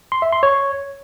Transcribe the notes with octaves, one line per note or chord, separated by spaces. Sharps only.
C6
E5
C6
C#5